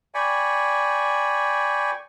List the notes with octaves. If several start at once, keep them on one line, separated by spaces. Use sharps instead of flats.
D5 G5 G#5 B5 C#6